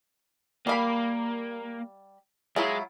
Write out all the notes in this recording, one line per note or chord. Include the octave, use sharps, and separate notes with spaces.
G3 A#3 F5 B5
F#3 G#3 E4 F4